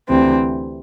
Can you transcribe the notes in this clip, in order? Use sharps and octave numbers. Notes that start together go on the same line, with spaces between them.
D2 C3 E3 C4